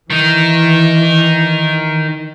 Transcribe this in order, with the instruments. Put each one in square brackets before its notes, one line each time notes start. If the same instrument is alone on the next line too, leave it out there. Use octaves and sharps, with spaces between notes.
[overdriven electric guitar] D#3 D#4 [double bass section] E3